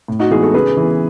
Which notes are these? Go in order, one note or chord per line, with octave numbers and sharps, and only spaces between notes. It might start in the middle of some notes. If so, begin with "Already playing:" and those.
A2
D#4 F#4
E3 G#3 B3 G#4
F#4 A4
C#3 G#4 B4
E3 B3